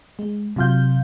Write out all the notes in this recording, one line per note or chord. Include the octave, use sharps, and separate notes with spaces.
G#3
C3 F#3 F4 F5 G6